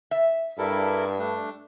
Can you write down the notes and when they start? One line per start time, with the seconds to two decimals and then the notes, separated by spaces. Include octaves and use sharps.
0.11 E5
0.58 G2 E4 A4 A#4
1.19 A3 D4